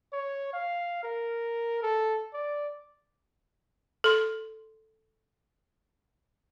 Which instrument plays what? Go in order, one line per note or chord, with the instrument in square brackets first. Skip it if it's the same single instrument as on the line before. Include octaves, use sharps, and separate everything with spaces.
[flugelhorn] C#5
F5
A#4
A4
D5
[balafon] A4 C6